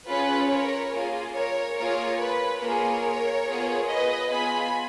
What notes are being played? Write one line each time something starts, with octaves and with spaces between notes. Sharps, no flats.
C#4 F4 G#4 B4
A#4 C#5
A#3 F4 G#4
A#4 C#5
A#3 F4 G#4 A#4 C#5
B4
A#3 F4 G#4 A#4 C#5
B3 F4 G#4
B4 D#5
B3 F4 G#4 G#5 B5